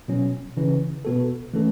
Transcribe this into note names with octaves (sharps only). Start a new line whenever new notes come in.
B2 F#3 C#4
C#3 E3 C#4
B2 B3 F#4 A4
E3 A3 C#4 A4